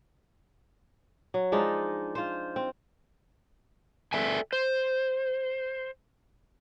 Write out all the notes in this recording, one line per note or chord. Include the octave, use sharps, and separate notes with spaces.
F#3
F3 G#3 D4 D#4
F4 C5
C4
A4 D5 E5 G5 G#5
C5